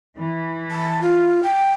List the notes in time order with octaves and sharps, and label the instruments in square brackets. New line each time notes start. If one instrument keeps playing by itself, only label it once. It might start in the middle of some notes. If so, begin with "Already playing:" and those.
[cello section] E3
[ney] A5
F4
G5